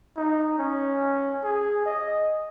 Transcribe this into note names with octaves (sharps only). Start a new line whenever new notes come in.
D#4
C#4
G#4
D#5